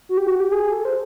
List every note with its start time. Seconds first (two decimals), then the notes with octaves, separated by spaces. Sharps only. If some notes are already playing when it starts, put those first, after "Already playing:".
0.09 F#4
0.17 G4
0.27 F#4
0.40 G4
0.52 G#4
0.72 A4
0.85 C5